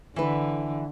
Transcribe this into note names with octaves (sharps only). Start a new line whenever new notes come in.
D3 E3 B4